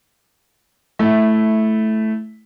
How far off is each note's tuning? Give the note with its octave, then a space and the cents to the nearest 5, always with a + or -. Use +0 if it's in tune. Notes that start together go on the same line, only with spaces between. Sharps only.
A3 -10 E4 +0